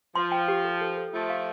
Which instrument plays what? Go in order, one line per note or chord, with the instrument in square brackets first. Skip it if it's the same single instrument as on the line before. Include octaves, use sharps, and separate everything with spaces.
[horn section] F3 [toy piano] C6
[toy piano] G5
G4
A4
A4
A4
[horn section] F3 A3 [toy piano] F4
[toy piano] F5